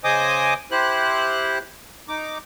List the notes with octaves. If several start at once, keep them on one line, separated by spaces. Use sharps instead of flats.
C#3 C5 D#5 G#5 D6 D#6
E4 G4 C5 F#6
D#4 D6